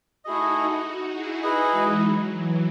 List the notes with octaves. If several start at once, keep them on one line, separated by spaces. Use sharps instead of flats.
A3 D#4 E4 F#4 G#4 D#5
E4 G#4
D#4 E4 F#4 G#4 B4 D#5
E3 G#3
F#3
E3